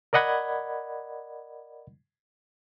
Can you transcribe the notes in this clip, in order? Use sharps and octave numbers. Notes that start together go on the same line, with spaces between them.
A#4 D5 D#5 F#5 B5 G#6